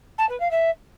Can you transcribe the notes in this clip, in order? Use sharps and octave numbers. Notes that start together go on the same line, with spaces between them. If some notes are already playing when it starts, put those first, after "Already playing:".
A5
B4
F5
E5